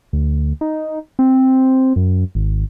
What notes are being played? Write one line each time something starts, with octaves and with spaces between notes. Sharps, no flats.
D2
D#4
C4
F#2
G#1